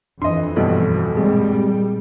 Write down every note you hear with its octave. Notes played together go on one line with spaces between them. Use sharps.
F2 E3 D4 D#5 C6
B1 G2 B2 A4
A#2 G3 G#3 C4 G#4